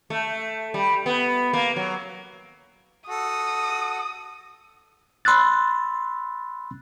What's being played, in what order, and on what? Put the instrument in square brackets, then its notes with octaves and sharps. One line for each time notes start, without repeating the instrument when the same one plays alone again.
[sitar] A3
G3
B3
A#3
F#3
[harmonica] F#4 A4 [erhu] D#6
[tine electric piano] B5 C6 E6 F#6 A6